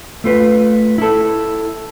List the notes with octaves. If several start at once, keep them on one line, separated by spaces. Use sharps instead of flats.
A3 F4 B4
E4 A4